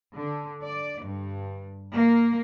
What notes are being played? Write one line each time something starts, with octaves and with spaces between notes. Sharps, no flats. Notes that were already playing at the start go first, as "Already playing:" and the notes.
D3
D5
G2
A#3